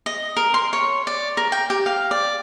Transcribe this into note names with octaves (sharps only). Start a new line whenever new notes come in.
D#5
A#4
C6
C#5
D5
A#4
G5
G4
F5
D5